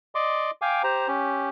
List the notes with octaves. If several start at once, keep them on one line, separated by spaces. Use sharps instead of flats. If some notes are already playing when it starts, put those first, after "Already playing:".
D5 D#5 C6 D6
F5 G5 G#5 D6
G4 C5 A#5
C#4 G4